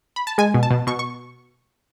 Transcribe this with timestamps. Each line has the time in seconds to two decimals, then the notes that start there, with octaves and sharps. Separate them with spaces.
0.16 B5
0.27 A5
0.38 G#3 G#5
0.54 B2
0.63 A5
0.71 B2
0.87 B2 C#6
0.99 C#6